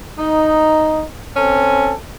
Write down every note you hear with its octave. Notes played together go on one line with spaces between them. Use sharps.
D#4
C4 C#4 A4 G#5